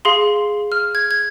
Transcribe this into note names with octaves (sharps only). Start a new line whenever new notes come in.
G#4 F5 C6
F6
G#6
G#6